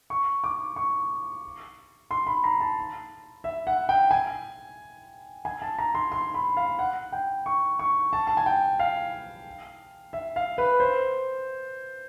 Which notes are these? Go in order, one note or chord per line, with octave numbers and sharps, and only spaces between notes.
C#6
D6
C#6
C6
B5
A#5
A5
E5
F#5
G5
G#5
G#5
A5
A#5
C6
C6
B5
F5
F#5
G5
C#6
C#6
A5
A5
G#5
G5
F5
E5
F5
B4
C5